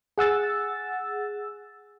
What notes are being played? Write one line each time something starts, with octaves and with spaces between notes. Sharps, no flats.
G#4 F#5 E6 A6